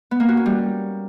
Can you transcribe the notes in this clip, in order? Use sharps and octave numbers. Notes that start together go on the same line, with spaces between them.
B3
A#3
F#4
C#4
G3